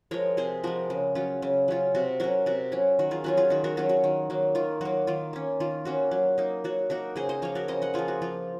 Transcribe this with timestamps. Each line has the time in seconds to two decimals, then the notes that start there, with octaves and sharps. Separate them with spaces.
0.11 F3 G#3 A#4 C#5
0.37 C3 G#4 C5
0.63 F3 G#3 F#4 A#4
0.90 C#3
1.15 F#3 C#4 F4
1.42 C#3
1.68 F#3 C#4 F4
1.95 C3 F#4
2.20 F#3 C#4 F#4 A#4
2.46 C3 F#4
2.72 F#3 C#4
2.99 D#3 F#4
3.11 F4 G#4
3.24 F#3 C#4 F4 F#4
3.37 F4 G#4
3.50 D#3 F#4
3.64 F#4 A#4
3.77 F#3 C#4 F4 F#4
3.89 F#4
4.04 D#3
4.30 F#3 A#3
4.55 D#3 F4
4.81 F#3 A#3 F#4
5.07 D#3 F4
5.33 A#3 C#4
5.60 D#3 F4
5.85 A#3 C#4 F#4
6.11 F#3
6.38 A#3 D#4
6.64 F#3 F#4
6.90 A#3 D#4 F#4 A#4
7.16 C#3 G#4 C5
7.29 C5 D#5
7.42 F3 A#3 C#5 F5
7.55 F#4 A#4
7.68 C#3 C5 D#5
7.82 D#5 F#5
7.94 F3 A#3 F4 G#4
8.08 F#4
8.22 F3 F4